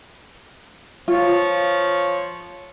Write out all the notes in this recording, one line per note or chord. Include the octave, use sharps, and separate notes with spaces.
F3 F4 C#5